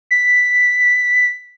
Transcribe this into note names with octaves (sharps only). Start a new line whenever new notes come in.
B6